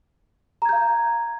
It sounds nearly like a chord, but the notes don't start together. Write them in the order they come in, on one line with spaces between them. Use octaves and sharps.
A#5 G#6 G6 F5